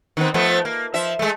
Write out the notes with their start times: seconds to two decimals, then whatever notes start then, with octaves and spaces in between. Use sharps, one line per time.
0.17 D#3 B3 C4
0.34 F3 A3 B3
0.65 A#3
0.94 F3 E5
1.19 G#3 A3